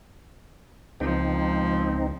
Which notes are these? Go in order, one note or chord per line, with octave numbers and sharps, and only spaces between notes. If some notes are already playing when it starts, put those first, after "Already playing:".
C#2 F3 C4 D#4